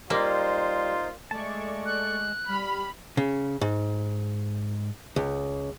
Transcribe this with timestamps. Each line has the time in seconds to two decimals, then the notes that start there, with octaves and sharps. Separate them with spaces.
0.10 G3 A#3 D#4 F4 C5
1.31 G#3 A3 D5 A5 C#6
1.86 F#6
2.47 G3 B5 F6
3.17 C#3
3.61 G#2
5.16 C#2